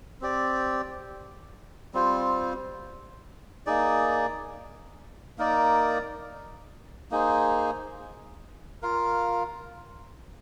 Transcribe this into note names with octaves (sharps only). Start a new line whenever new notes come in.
C4 G4 D5
G3 C4 F4 C5
A#3 D#4 G#4 D5
A#3 D#4 A#4 D5
A#3 D#4 G#4 C5
F4 A#4 F5